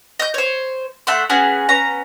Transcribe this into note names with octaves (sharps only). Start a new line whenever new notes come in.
D#5 G6
C5 C#5
A3 E5 F#5 C6
B3 C#4 F#4 G#4
B3 C#4 A#5